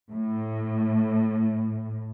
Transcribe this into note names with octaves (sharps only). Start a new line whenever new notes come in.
A2